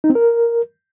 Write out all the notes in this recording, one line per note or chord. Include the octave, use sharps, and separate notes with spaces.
D#4
C4
A#4